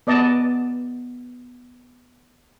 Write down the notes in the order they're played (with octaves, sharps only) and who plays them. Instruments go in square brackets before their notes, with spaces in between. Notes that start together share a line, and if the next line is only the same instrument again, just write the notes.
[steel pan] B3 D5 D#5 A5